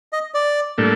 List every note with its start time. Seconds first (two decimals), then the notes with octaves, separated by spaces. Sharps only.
0.13 D#5
0.34 D5
0.78 A2 G3 A#3 D4 A4